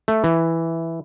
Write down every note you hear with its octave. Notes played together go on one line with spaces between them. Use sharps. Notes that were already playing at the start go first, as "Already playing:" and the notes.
A3
E3